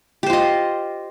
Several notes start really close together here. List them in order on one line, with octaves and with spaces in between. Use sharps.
G4 C5 F4 D#5